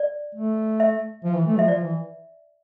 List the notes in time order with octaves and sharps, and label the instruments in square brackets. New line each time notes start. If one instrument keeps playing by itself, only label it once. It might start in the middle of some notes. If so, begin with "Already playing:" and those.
Already playing: [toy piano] D5
[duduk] A3
[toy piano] E5
[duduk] F3
E3
A3
[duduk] F3 [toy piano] E5
[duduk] F3 [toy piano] D5
[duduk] E3